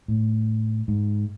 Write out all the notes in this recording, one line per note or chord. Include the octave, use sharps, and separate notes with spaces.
A2
G#2